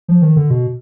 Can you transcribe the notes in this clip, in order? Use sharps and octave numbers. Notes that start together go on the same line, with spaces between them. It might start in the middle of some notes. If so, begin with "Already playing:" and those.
F3
D#3
D3
B2